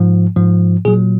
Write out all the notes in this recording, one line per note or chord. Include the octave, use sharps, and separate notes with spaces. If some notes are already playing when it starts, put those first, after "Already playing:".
Already playing: G#2 F3
G#2 F3
A#2 F#3 G#4